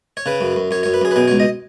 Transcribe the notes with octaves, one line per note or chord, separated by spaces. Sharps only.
C#5
C#3 B4
F#2
F#2
F#2 C#5
F#2 C#5
B4
F#2 G#4
B4
B2 G#4
C#5
C#2
D#5